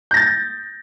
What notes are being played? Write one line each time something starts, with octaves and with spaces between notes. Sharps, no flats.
G6 A6 A#6